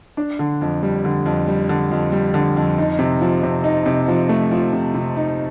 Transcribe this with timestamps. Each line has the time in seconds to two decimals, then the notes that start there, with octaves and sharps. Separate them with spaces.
0.17 D4
0.39 D3
0.61 F2
0.83 G3
1.05 D3
1.26 F2
1.48 G3
1.69 D3
1.91 F2
2.12 G3
2.34 D3
2.56 F2
2.78 D#4
2.99 C3
3.21 F3
3.43 C3
3.64 D#4
3.86 C3
4.08 F3
4.29 A3
4.51 F3
4.73 C3
4.94 C3
5.16 D#4